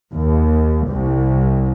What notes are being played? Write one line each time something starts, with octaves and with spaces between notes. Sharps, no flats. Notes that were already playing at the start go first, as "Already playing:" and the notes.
D#2
C2